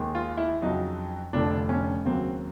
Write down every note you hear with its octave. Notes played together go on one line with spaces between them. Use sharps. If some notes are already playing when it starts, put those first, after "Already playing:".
Already playing: D#2 D#3 G#3
F4
E4
F2 C#3 F#3 D#4
F1 F2 D3 F3 D4
C#4
D#2 C#3 F#3 C4